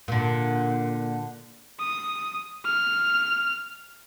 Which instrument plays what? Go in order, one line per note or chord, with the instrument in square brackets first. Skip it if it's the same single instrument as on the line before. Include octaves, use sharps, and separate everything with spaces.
[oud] A#2 D3
[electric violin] D#6
F6